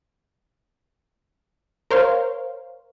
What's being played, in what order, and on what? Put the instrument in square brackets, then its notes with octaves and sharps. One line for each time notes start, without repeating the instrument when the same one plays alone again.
[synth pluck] A#4 C5 C#5 F5